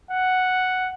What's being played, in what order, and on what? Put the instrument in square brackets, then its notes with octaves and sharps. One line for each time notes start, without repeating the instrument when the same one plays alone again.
[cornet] F#5